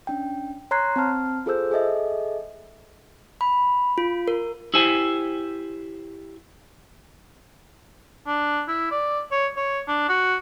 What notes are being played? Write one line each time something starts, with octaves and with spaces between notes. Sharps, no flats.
C#4 D4 G5
C#5 A#5 C6 F#6 G#6 C7
C4 A5 F6
F4 G#4 A4 C5 E6 G6
G#4 A4 D#5 E5
B5
F4
A#4
E4 G4 C5 G#5
D4
E4
D5
C#5
C#5
D4
F#4